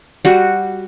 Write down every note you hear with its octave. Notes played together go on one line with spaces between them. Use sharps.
G3 F#4